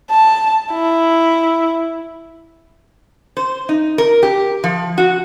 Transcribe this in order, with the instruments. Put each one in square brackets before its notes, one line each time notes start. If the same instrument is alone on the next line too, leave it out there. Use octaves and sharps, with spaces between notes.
[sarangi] A5
E4
[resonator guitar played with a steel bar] C5
D#4
A#4
G4
F3
F#4